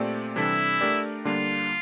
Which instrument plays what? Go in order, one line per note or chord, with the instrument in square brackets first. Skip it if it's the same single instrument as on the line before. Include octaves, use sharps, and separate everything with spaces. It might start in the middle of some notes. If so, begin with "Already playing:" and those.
Already playing: [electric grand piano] A#2 A3 C4 G4 D5
[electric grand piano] C3 E3 G3 D4 A4 [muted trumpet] E4
[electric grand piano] A3 D4 G4 A#4 D5
[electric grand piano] D3 G3 A#3 D4 [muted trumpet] F4